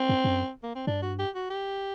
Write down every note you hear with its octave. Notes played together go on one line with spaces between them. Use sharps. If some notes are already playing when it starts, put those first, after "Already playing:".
Already playing: C4
F#2
F#2
A#3
C4
G2 D4
F#4
G4
F#4
G4